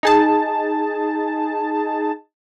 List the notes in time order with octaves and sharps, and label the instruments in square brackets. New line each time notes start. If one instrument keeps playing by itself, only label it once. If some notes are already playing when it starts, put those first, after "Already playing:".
[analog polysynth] D#4 G#4 A5